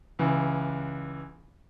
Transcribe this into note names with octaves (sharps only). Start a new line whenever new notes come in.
C#2 E3